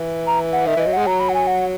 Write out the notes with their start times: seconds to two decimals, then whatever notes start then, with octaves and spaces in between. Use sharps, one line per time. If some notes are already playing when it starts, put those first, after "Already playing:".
Already playing: E3
0.27 A#5
0.53 F#5
0.66 D#3 E5
0.77 E3 D#5
0.86 F#3
0.93 G#3 F#5
1.06 F#3 A#5
1.20 B5
1.29 F#5
1.34 G#5
1.47 F#5